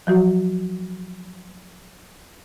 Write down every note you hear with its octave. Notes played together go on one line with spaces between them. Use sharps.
F3 F#3 F#4